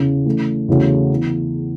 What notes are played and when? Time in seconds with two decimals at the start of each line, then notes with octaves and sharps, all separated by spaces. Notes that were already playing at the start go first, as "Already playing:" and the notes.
Already playing: E2 C#3 E3 C#4
0.26 E3 A3 C#4
0.68 E2 C#3 A3 C#4 F#4
1.11 E3 B3